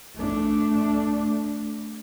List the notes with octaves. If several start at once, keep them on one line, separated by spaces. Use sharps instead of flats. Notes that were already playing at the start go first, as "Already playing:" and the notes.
A3 D4